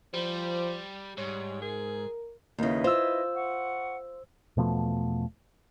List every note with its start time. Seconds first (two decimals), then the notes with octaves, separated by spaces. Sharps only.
0.14 F3 G3 C5
1.18 G#2 G3 C#5
1.62 G#4 A#4
2.59 D#2 C#3 E4 B4 D#5
2.84 F4 C5 E6
3.34 F#5 C#6
4.57 E2 B2 F3 A3